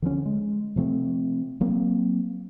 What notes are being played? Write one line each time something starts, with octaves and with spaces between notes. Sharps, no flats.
D3 F3 G3 C#4
G#3
C3 F3 A3 C4
F#3 A#3 C4